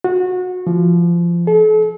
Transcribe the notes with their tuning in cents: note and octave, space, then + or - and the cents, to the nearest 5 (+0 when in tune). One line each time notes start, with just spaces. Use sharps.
F#4 -25
F3 -25
A4 -40